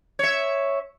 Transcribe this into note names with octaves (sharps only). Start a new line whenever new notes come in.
C#5 E5